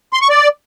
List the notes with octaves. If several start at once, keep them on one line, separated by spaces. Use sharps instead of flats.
C6
C#6
D5